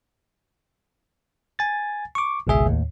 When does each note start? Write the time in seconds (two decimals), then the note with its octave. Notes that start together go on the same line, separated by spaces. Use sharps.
1.59 G#5 A6
2.15 C#6 D6
2.47 G#1 C#2 B2 G#4 E5
2.66 D#2 A2